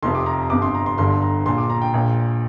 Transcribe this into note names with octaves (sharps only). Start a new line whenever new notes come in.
F1 F2 C3 C6
D6
A#5
G1 F2 C3 D6
C6
A#5
C6
G1 G2 D3 C6
A#5
A#1 A#2 C6
D6
A#5
G5
A#1 A#2